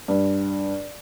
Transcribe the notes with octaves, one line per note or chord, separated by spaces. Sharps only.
G2